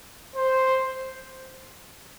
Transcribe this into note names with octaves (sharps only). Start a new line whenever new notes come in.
C5